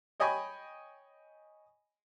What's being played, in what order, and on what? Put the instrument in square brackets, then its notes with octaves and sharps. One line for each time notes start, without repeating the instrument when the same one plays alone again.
[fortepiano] C#5 D#5 G5 G#5 B5 C#6